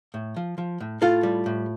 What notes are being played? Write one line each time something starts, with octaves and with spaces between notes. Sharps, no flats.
A2
F3
F3
A2
A2 F4 A4
G3
A2